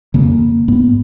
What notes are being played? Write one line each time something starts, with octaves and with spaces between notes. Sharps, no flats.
F2 C#3 A#3
G#2 B3